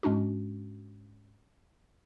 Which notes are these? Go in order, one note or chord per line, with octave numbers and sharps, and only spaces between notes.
G#2 G#3 C#4 D4 F#4